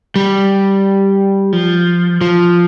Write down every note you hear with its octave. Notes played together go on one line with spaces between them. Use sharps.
G3
F3
F3